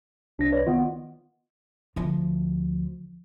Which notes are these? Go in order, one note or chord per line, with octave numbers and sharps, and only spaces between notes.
C2 D4 A#6
B4 C#5 D5
D#3 B3 F4
D2 F3